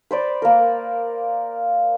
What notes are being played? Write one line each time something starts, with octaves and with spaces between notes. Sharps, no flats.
B4 C5 D5
A#3 A#4